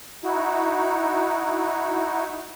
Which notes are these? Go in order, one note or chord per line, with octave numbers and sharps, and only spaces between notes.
D#4 E4 F#4